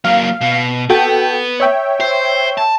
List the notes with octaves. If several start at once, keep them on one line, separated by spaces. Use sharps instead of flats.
F#3 A#3 F5
B2
B3 F#4 A4 G5
C#5 E5 G5
C5
A5